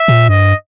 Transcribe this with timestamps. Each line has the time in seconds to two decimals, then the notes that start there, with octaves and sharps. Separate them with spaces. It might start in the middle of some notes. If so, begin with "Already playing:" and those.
Already playing: E5
0.08 A#2
0.29 G2 D#5